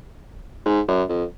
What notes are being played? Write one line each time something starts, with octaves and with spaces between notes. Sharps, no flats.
G#2
F#2
F2